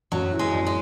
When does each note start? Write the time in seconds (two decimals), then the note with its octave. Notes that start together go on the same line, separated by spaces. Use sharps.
0.12 F#2 F#3
0.32 E3
0.39 G#3
0.53 F#2
0.67 G#3